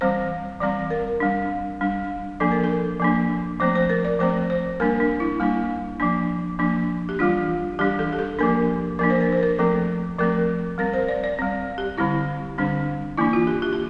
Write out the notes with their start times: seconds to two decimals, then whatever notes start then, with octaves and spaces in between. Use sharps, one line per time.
0.01 E3 G3 C4 C5
0.61 E3 G3 C4 D5
0.90 A#4
1.20 G3 D4
1.81 G3 D4
2.40 F3 A#3 D4 A4
2.51 A#4
2.64 A4
3.00 F3 A#3 D4
3.60 F3 A3 C4 C5
3.75 C5
3.89 A#4
4.05 D5
4.19 F3 A3 C4 C5
4.50 C5
4.80 G3 A#3 D4 A#4
5.00 D4
5.20 E4
5.40 G3 A#3 D4 E4
6.00 F3 A#3 D4
6.59 F3 A#3 D4
7.09 G4
7.19 E3 G3 D4 F4
7.79 E3 G3 D4 G4
7.99 A4
8.12 G4
8.19 A4
8.39 F3 A#3 D4 A#4
8.99 F3 A#3 D4 A#4
9.10 C5
9.21 A#4
9.32 C5
9.43 A#4
9.59 F3 A3 C4 A4
10.19 F3 A3 C4 A#4
10.78 G3 C4 A#4
10.94 C5
11.08 D5
11.24 D5
11.39 G3 C4
11.78 G4
11.98 D3 G3 C4 E4
12.58 D3 G3 C4 D4
13.17 E3 A#3 D4 E4
13.33 F4
13.47 G4
13.62 G4
13.73 G4